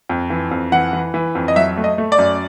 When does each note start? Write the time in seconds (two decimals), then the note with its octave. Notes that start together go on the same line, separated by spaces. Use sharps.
0.09 F2
0.30 E3
0.51 F2
0.72 E3 F#5
0.93 E3
1.14 E3
1.35 F2
1.48 D#5
1.56 F#3 E5
1.77 A3
1.84 D#5
1.98 A3
2.12 D5
2.18 F#2